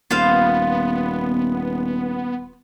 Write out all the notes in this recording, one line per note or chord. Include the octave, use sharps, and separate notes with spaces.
D#1 B3 F4 C5 F5